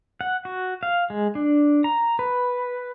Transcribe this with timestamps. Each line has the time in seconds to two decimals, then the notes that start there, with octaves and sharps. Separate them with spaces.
0.21 F#5
0.45 F#4
0.83 F5
1.10 G#3
1.35 D4
1.84 A#5
2.19 B4